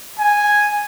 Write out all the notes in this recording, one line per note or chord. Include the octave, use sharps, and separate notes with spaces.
G#5